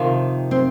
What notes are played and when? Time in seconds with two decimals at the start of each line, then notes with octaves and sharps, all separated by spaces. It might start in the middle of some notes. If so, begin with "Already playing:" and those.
Already playing: F2 C3 D#3 F4
0.51 C4